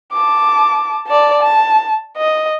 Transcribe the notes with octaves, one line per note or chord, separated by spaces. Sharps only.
A5 D6
D5 A5
A5
D#5